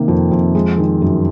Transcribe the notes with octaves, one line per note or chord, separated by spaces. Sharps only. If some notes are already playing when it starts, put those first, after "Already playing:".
Already playing: C3 D#3 A#3
F2
F2
G#3
D#3
F#2